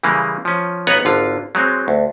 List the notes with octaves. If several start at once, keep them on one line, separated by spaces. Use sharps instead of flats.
C#3 E3 G3 G#3 A#3
F3 C#4
B1 B3 B4 C#5 F#5 A#5
G#1 D3 F4
F#3 G#3 C4
D2